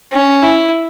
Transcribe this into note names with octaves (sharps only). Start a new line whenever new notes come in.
C#4
E4